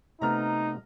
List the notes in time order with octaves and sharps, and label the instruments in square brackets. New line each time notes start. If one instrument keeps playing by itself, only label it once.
[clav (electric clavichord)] C3 A3 B3 [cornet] D#4 [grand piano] A#5 F6